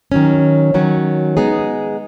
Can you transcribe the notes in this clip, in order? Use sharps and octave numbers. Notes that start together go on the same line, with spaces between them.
D#3 F#3 C#4
D#3 F#3 C#4
G#3 B3 D#4 G#4